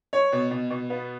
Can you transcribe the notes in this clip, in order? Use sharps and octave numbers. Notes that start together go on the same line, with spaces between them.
C#5
B2
B2
B2
B3